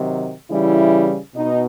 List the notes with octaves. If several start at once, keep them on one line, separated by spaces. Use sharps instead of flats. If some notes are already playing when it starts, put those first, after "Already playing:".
Already playing: C3 D#3 F#3
C#3 E3 G3 E4
B2 D#4